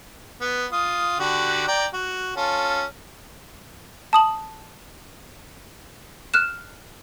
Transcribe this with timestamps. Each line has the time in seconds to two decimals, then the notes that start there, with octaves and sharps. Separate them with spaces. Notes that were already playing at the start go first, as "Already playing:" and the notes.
0.41 B3
0.72 F4 D#6
1.19 D3 F#4 G4
1.68 D5 G5 A#5
1.94 F#4
2.37 C#4 F4 A4
4.13 A5 D#6 F#7
6.34 F6 F#6 E7